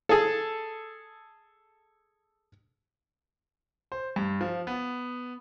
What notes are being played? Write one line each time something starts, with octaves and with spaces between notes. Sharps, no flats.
G#4 A4
C5
G2
F3
B3